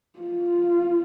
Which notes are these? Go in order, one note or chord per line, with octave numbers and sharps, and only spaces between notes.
F4